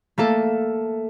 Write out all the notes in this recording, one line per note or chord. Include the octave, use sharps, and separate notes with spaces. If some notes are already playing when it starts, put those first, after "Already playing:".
A3 A#3 A4